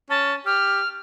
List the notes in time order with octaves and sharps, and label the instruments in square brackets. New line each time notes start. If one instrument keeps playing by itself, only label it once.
[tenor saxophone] C#4 [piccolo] A5
[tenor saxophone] G4 [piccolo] F6